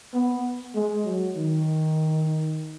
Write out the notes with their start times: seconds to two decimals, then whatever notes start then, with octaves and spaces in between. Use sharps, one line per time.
0.14 B3
0.75 G#3
1.05 F#3
1.36 D#3